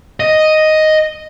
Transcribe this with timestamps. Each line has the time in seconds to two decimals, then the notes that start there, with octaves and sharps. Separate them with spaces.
0.20 D#5